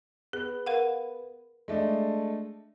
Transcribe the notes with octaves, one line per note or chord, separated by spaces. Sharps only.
B3 G#4
A#4 F5 F#5
G#3 A3 D4